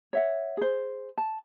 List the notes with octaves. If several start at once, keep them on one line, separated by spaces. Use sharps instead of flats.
C#5 E5 F#5
G#4 C5
A5